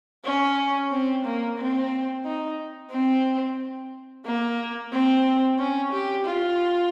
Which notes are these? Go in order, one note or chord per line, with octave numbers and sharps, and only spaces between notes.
C#4
C4
A#3
C4
D#4
C4
A#3
C4
C#4
G4
F4